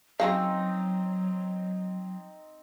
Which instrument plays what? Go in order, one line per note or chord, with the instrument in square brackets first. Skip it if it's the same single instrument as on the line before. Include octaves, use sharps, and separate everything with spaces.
[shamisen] C#3 F#4 F5 [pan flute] F#3 [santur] C4 D#4